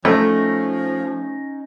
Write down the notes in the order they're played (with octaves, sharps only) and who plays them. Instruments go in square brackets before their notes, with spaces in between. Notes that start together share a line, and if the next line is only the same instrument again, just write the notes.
[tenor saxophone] F3 [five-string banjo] A3 [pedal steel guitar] C#4 D#4